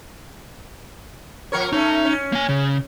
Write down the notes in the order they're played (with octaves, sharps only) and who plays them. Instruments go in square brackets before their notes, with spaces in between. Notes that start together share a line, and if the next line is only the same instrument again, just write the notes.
[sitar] F3 A#4 C#5
[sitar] A3 C#4 [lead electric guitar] D#4
[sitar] C#4
[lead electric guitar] A#3 G#5
C#3